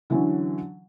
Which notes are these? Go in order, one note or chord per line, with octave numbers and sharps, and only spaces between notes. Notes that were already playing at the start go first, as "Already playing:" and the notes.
D3 E3 F#3 C#4